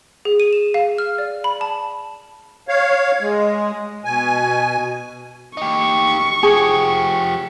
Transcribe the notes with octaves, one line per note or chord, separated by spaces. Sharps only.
G#4
D#7
E7
F5
F6
D5
B5
A5
C#5 F5
G#3
B2 G#5
D#4 G4 C#6
F3 G4 G#4